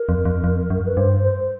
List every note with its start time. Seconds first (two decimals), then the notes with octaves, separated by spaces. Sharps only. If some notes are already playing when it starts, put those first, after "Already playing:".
Already playing: A#4
0.09 F2
0.25 F2
0.44 F2
0.70 F#2
0.86 B4
0.97 G2 C5
1.23 C5